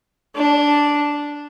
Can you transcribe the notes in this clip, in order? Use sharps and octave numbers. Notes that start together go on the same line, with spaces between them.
D4